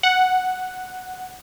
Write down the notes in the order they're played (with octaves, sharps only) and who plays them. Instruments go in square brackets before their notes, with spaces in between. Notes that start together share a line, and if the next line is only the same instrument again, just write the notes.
[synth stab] F#5